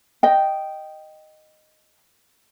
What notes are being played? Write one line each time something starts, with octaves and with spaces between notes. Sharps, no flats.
D#5 G5